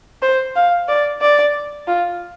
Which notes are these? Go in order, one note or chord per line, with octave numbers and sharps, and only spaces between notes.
C5
F5
D5
D5
F4